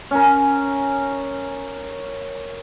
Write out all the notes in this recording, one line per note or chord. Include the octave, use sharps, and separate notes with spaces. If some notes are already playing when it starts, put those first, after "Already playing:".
C#4 A#4